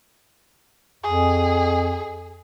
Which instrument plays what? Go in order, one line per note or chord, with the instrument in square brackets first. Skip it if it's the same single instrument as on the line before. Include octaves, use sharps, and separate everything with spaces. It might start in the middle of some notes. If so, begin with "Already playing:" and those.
[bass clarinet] F2 [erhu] G#4